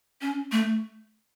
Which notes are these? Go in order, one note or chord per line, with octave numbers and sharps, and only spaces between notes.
C#4
A3